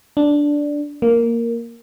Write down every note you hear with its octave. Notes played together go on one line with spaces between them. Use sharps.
D4
A#3